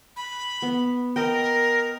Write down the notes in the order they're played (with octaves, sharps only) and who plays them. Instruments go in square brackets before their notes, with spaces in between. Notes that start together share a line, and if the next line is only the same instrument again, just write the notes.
[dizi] B5
[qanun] B3
[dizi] A#4 [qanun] D#5 G5